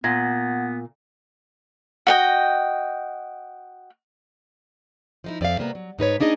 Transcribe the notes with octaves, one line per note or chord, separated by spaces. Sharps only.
A#2 B3 F#5 G#6 A#6
F#4 D#5 G5
F3 D#4 E4
F2 D5 E5 F5
C3 A#3 B3
F#3
G#2 D#4 B4 C#5
A#3 D4 D#4 G#4 D#5